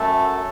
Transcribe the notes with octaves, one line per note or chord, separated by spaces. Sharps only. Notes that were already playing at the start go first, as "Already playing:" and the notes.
Already playing: F#2 A3 A4
F#3